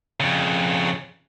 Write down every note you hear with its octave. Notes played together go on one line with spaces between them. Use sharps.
F2 C#3